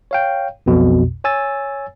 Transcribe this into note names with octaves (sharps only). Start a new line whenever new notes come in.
C#5 F5 G5
B1 F2 B2
C#5 G#5 E6 A6